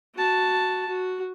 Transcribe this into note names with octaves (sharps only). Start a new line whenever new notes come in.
F#4 A5
F#4